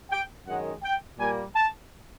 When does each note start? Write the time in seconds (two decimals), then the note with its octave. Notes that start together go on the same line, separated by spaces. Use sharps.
0.10 G5
0.46 F#2 D#3 G#3 C#4 F#5
0.83 G5
1.19 A#2 G3 A#3 G#5
1.55 A5